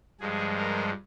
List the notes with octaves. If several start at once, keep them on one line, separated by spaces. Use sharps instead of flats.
G2 F3 G#3 G#4
A#4